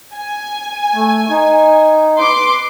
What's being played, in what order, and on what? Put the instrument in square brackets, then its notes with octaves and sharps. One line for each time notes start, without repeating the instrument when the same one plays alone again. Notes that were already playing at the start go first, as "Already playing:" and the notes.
[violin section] G#5
[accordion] A3
D#4
[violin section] B4 C6 D6